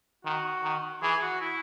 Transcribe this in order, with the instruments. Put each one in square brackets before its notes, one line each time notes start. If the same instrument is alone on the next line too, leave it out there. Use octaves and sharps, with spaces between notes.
[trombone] D#3 [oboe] F#4
[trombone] D#3
[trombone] E3 [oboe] G#4
[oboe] F#4
E4